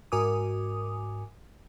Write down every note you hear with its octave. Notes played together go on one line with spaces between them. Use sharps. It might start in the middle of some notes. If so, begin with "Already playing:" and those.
G#2 F#4 A#4 G#5 D6 D#6